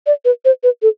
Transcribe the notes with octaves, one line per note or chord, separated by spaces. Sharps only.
D5
B4
C5
B4
A4